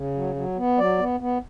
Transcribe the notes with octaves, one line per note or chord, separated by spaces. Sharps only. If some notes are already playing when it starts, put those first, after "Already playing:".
Already playing: C#3
F#3
F#3
B3
F#3 D5
B3
B3